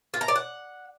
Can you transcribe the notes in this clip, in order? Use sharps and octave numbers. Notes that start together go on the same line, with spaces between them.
F4
A#5
D5
F#5